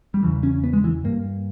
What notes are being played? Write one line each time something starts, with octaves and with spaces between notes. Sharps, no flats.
G3
E2 C#3 E3
C#4
B3
G#3
E3
G2 A#3